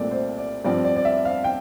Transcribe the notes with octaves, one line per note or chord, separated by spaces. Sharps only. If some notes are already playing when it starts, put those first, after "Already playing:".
Already playing: C2 A#2 A3 C4 D5
C5
D5
G2 F3 C4 D5
D5
D5
E5
F5
G5